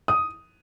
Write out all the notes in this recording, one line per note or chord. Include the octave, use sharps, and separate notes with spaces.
D#6